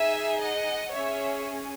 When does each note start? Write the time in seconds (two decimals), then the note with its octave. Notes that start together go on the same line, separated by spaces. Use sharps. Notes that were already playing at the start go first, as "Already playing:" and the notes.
Already playing: D#4 G#4 E5 G#5
0.40 D#5 F#5
0.94 C#4 G#4 C#5 E5